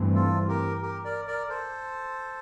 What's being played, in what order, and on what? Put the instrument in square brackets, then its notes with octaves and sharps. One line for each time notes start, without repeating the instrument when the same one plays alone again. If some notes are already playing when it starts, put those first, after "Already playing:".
Already playing: [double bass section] G2 E3 A3 C4
[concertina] F4 A4
G4 A#4
G4 A#4
A#4 D5
A#4 D5
A4 C5